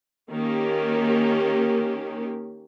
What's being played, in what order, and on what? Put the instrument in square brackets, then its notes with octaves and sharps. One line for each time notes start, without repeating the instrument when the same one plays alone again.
[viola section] D#3 A#3 C#4 G4